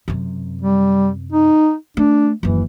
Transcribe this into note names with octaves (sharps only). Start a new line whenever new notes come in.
F#2 C3
G3
D#4
A3 D4
F#1 D#2 E3